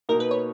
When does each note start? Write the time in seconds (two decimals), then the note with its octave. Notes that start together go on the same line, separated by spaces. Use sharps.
0.09 B2 A#3 D#4 A#4
0.20 B4
0.31 C#5